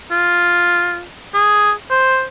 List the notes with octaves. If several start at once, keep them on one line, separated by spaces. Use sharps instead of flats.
F4
G#4
C5